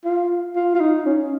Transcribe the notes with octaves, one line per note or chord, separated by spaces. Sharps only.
F4
F4
F4
D#4
C#4